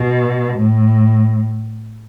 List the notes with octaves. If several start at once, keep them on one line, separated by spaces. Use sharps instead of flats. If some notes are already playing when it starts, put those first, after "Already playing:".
Already playing: B2
A2